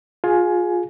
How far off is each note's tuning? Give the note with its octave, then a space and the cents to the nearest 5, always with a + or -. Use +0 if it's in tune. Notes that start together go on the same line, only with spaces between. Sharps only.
F4 +25 G#4 +0 G#5 +15